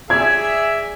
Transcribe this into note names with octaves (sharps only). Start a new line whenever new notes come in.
G#4 D5 E5 G#6